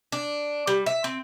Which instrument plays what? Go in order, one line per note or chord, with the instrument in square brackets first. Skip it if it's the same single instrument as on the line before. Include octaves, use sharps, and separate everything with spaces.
[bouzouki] D4
G3
E5
C4